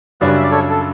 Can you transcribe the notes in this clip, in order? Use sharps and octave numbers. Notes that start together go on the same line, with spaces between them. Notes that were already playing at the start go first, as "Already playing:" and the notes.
F#2 C#3 G3 D4 F#4 B4 D5
E5
D5
A4 C#5
A4